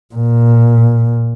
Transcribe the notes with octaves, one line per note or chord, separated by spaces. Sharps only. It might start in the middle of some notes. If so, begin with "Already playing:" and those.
A#2